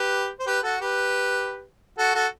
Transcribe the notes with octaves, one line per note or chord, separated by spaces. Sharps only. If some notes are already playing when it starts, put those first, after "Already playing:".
Already playing: G4 B4
C5
G4 B4
F#4 A4
G4 B4
F#4 A4
F#4 A4